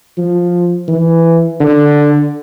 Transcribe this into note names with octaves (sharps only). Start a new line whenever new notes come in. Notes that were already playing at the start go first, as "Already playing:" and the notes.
F3
E3
D3